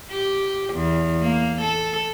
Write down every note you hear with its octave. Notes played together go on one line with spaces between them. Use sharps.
G4
E2
A#3
A4